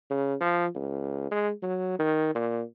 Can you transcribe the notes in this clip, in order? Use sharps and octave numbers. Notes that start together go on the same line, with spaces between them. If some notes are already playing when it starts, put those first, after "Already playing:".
C#3
F3
C#2
G#3
F#3
D#3
A#2